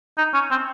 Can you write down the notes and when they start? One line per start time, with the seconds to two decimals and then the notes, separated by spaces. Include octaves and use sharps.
0.18 D#4
0.34 C#4
0.51 C4